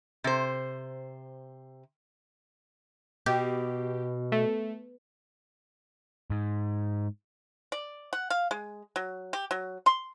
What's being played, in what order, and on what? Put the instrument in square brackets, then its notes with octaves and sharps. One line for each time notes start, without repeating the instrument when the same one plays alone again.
[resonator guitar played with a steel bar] C3 C5
[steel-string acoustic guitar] B2 [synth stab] G4
[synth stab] A3
[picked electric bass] G#2
[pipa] D5
F#5
F5
G#3
F#3
G4
F#3
C6